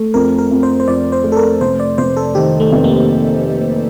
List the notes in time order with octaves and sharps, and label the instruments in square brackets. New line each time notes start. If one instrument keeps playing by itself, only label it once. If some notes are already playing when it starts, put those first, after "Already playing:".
Already playing: [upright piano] A3
[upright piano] F2 [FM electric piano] A#4
[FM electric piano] A#4
[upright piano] F2
[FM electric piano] C5
C5
[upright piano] F2 [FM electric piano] D5
[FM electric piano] C5
[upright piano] A3
[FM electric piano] A4
A#4
[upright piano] F1 [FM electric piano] C5
[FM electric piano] D5
[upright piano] F1 [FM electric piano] C5
[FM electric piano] A4
[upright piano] D#3 [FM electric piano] G4
[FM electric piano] A3
[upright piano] F1
[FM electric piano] A#3